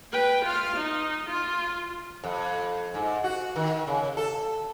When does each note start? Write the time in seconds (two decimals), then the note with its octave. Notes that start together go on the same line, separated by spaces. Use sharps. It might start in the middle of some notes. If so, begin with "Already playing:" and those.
0.12 B4 G5
0.45 F4 F5
0.76 D#4
1.29 F4
2.24 F2
2.94 G#2
3.24 F#4
3.56 D#3
3.87 C#3
4.17 A4